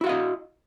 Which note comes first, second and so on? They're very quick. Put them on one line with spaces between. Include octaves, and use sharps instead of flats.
E4 F#4 F5 D#5